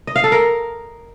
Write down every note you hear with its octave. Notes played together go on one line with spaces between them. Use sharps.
D#5
F5
A4
A#4